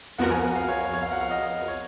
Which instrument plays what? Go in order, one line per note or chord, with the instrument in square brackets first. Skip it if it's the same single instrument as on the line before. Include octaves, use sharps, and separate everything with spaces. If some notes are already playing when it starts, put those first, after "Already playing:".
[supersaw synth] F2 F3 B3 F#4 A#4 [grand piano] F#5
[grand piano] G#5
F#5
F5
C#5
C#5
C#5
F5
F#5
F5
D#5
C#5